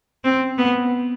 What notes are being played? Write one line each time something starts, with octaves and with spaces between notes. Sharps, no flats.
C4
B3